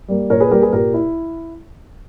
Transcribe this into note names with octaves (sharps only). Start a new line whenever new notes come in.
G3 A#3
A#2 A#4 C#5
G#4 B4
G3 A#3 G4 A#4
G#4 B4
A#2 G4 A#4
E4